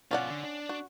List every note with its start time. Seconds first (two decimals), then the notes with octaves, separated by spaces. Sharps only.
0.11 B2 C#4 F4 D5 F#5
0.29 D3
0.44 D4
0.69 F#4